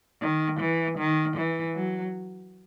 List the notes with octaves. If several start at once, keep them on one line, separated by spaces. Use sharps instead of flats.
D#3
E3
D#3
E3
F#3